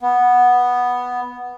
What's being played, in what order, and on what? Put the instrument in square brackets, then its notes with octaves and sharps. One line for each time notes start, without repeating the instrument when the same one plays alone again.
[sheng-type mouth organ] B3